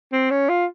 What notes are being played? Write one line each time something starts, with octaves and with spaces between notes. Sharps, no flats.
C4
C#4
F4